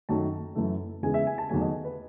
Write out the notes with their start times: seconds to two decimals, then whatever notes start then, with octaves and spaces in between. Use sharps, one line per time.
0.09 F#2 D#3 F#3 A3 A5
0.55 F#2 E3 A3
1.03 E2 C#3 E3 G#3 G#5
1.14 E5
1.27 G#5
1.38 A5
1.49 E2 D#3 F#3 A3 G#5
1.61 D#5
1.85 B4